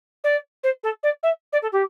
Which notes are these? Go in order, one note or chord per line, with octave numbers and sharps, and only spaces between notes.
D5
C5
A4
D5
E5
D5
A4
G4